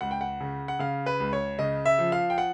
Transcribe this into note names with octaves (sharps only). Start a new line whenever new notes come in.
C#2 F#5
G5
F#5
C#3
F#5
C#3 F5
B4
C#2
C#5
C#3 D#5
E5
F3
F5
G5
F#5